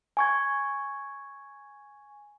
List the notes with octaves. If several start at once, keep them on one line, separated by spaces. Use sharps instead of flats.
G#5 C#6 G#6